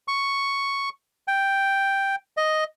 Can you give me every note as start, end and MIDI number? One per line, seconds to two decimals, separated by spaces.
0.08 0.89 85
1.28 2.16 79
2.37 2.64 75